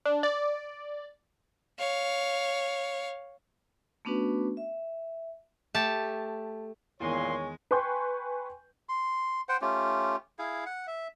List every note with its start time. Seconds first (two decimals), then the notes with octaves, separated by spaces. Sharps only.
0.06 D4
0.23 D5
1.79 C#5 F5
4.05 A3 B3 C#4 D4 F#4 B4
4.57 E5
5.75 A3 G4 A5
7.00 E2 A#2 D#3 G#3 C#5 C6
7.71 B4 G5 G#5 C6 C#6 G6
8.89 C6
9.49 C5 F#5 G5
9.61 A3 C#4 F4 G4
10.39 E4 G#4 F5
10.66 F#5
10.87 E5